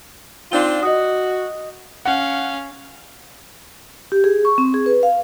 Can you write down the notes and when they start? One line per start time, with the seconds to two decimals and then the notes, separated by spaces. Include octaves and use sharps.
0.52 C4 D4 D#4 F4 G7
0.83 F#4 D#5 D#6
2.05 C#4 F5 F#5
4.12 G4
4.24 G#4
4.45 C#6
4.58 C4
4.74 G#4
4.86 B4
5.03 F5